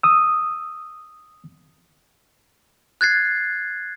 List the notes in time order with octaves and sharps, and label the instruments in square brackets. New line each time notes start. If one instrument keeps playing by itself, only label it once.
[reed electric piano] D#6 E6
[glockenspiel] F#6 G#6 A6 C7